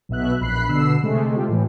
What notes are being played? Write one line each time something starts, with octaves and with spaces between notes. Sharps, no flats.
B1 B2 E5 F#6
A#1 B5 F#6 C7
B2 D3 E6 C7
C3 G#3 A3
C4 F4 G4
A2 E3